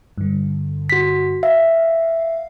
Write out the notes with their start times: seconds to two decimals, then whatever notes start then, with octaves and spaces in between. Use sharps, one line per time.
0.18 G2 D3
0.90 F#4 B6
1.43 E5 F5